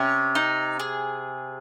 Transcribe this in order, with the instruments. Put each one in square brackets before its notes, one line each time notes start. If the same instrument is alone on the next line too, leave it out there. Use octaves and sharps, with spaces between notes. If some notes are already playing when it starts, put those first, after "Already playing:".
Already playing: [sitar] C3 [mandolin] C#4
[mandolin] D#4
G#4